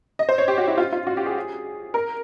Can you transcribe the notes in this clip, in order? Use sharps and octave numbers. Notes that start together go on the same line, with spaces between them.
D#5
C5
C#5
G4
F#4
E4
F4
F4
F#4
G4
G#4
A#4